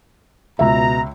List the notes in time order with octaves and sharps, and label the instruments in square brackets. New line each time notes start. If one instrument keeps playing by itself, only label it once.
[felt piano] C#2 E5 [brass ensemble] B2 A#5